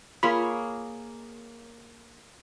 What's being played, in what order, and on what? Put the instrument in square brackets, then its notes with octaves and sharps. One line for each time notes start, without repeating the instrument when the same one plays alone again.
[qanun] A#3 G#4 C#5 [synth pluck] F4 B5